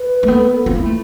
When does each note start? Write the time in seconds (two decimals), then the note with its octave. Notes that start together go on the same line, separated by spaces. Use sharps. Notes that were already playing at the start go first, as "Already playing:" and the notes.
Already playing: B4
0.23 A3
0.28 B3 A4
0.41 B4
0.53 A4
0.66 C4 F4
0.75 B3 E4
0.86 A3